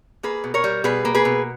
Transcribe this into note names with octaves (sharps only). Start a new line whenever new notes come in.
A#3 G#4 B4
B2
A#4 C#5
G3
B2 G#4 B4
A#3
G#4 B4
B2